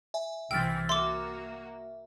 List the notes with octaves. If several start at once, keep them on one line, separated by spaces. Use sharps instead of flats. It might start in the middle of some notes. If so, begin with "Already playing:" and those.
E5 G#5
C2 E3 C4 G5 E6 F6 A6
A#3 F#4 E5 C6 D6